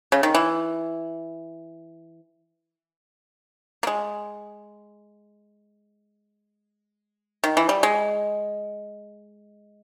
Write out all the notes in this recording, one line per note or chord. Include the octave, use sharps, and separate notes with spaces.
C#3
D#3
E3
A#3
G#3
D#3
E3
G3
G#3